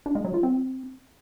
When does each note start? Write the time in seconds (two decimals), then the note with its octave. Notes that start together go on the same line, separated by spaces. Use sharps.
0.06 D4
0.15 G#3
0.25 F#3
0.34 F4
0.43 C4